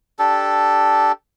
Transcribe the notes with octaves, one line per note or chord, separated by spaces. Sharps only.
D4 G4 A4